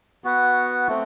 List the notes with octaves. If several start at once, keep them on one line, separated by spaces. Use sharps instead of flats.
B3 F#4 B4 F#5
A3 C4